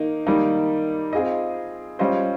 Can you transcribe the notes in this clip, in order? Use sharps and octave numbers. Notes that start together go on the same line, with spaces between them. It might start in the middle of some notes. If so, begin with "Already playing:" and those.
Already playing: D#3 A#3 D#4
D#3 G3 A#3 D#4
C4 F4 G#4 D#5
G3 C#4 F4 C5 D#5